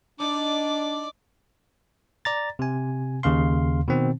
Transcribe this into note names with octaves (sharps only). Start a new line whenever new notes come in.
D4 D#4 D5 D6
D5 A#5 A6
C3 G#5
D#2 C#3 F5 C6
B2 D#3 C4